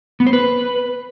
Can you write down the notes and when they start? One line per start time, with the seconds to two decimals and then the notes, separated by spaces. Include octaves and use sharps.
0.20 B3
0.27 C5
0.33 B4